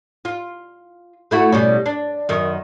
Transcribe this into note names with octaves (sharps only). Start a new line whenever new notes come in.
F4
A3 E4 F#4
B2 G3 C#4
D4
F#2 D#3